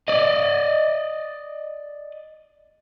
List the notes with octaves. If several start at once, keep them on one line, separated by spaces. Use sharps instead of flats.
D5 D#5